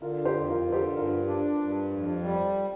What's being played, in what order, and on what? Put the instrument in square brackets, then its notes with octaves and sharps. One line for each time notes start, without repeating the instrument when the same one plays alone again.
[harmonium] D3 [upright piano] F4 A#4
[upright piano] G4 C5
[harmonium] F2
[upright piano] F4 A#4
[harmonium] D3
[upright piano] G4 C5
[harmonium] G2 [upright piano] F4 A#4
[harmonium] D4
G2
F2
G3